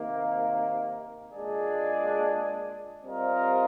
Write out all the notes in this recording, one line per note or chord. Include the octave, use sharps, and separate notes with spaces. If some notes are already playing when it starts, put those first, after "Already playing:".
Already playing: C3 D#3 A#3
A#2 G#3 D4 G#4 D5
G3 C4 F4 A#4 D#5